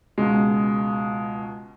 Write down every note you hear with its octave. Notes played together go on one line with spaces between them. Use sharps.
C#2 B2 G#3